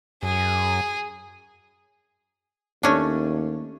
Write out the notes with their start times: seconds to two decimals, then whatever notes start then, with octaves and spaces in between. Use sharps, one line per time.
0.23 F#2 G#4
2.83 D#2 A3 C#4 D4